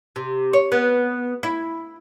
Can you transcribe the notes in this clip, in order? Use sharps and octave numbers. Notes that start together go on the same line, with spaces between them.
C3
C#5
B3
E4